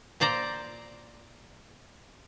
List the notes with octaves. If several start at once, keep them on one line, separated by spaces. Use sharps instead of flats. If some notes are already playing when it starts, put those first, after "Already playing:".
A#2 C5 D5 A#5